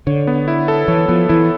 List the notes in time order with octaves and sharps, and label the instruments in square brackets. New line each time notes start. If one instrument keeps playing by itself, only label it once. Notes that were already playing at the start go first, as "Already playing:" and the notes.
[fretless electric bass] D3 [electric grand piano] C#5
[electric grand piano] B3
E4
A4
[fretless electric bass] E3 [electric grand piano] C#5
[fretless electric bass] F3 [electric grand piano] B3
[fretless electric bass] E3 [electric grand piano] E4